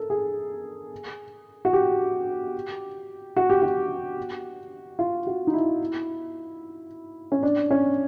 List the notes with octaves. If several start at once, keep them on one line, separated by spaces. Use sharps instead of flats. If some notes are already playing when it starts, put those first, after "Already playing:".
Already playing: A4 A#4
G#4
F#4
G4
F#4
G4
F#4
F4
F#4
D#4
E4
C#4
D4
C#4